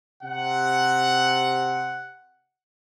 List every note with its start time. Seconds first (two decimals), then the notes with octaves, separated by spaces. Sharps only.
0.24 C3 F#5